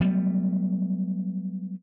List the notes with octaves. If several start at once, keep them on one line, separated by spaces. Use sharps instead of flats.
F#3 G3 A3 B3